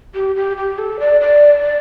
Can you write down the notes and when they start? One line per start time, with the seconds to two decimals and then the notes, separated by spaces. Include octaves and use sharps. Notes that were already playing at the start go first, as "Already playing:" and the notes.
0.15 G4
0.36 G4
0.57 G4
0.78 A4
1.00 D5
1.21 D5